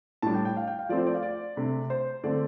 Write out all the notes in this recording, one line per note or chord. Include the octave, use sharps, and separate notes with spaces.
A2 G3 D4 A5
G5
G5
F5
G5
F5
F3 A3 C4 D5
C5
D5
F5
D5
C3 A3 D4
C5
D3 A3 C4 D5